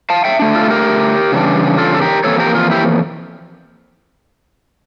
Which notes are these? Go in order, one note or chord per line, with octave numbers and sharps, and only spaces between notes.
F5 A5
E5 G5
D3 A3 D4
F4 A4
G4 A#4
C#3 E3 G3 D4
F4 A4
A4
G4 A#4
F2 E3 A#3 A4 C#5
G4 A#4
F4
E4 G4